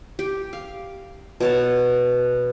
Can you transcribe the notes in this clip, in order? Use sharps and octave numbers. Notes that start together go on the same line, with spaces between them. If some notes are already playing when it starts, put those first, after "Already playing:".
G4
F5
B2 C#5 A5